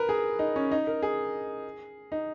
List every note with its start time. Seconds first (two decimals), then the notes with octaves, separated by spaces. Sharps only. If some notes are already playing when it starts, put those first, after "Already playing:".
Already playing: A#4 B4
0.09 G#4
0.39 D#4
0.56 C#4
0.72 D#4
0.87 A#4
1.03 G#4
2.12 D#4